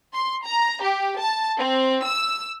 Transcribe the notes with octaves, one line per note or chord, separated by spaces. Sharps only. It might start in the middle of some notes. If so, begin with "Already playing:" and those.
C6
A#5
G4
A5
C4
E6